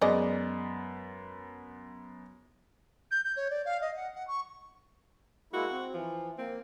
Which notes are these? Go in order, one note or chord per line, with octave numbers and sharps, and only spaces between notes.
F#2 G#3 B3 D5 D#5
G6
G6
C#5
D5
F5
D#5
F#5
F#5
C#6
G#3 A#3 E4 F#4
C4
E3 F3
A#3 C4